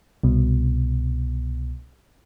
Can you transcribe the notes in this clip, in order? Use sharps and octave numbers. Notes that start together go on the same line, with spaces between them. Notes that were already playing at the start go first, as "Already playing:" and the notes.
C2 B2